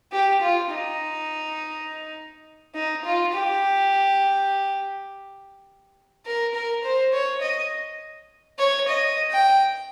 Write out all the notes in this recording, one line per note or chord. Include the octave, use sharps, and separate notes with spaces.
G4
F4
D#4
D#4
F4
G4
A#4
A#4
C5
C#5
D#5
C#5
D#5
G5